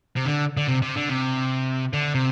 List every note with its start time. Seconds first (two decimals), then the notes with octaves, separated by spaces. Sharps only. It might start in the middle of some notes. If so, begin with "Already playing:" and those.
0.16 C3
0.26 D3
0.57 D3
0.68 C3
0.82 C3
0.96 D3
1.09 C3
1.93 D3
2.14 C3